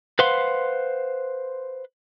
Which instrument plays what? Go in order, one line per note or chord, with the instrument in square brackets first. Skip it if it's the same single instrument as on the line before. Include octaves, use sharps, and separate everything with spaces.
[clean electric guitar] B4 C5 F5 F#5 C6